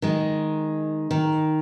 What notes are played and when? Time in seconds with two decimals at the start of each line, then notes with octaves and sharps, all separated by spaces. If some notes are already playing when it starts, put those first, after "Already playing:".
0.02 D#3 G#3
1.11 D#3